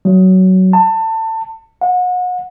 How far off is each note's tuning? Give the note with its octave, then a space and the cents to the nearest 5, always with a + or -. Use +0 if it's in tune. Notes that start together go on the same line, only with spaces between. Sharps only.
F#3 +15
A5 +25
F#5 -35